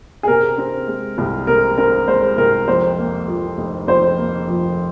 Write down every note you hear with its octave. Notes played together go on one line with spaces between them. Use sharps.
G#4
C3 A#4
C4
G#3
C2
C3 A#4
C4 A#4
G#3 C5
C2 A#4
F2 C5
A#3
F3
F1
F2 C5
A#3
F3